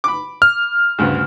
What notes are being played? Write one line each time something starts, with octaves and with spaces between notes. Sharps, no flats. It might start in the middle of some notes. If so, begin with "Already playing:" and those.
B5 D6
F6
D2 G2 C#3